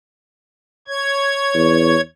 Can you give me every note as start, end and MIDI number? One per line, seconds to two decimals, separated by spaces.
0.88 2.01 73
0.88 2.01 92
1.55 1.96 40